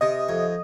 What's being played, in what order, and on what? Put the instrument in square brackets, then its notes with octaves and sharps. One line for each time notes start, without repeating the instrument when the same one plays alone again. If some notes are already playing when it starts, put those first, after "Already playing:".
[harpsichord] C3 [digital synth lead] D#5
[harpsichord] F2